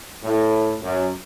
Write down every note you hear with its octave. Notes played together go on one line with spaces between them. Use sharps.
A2
F#2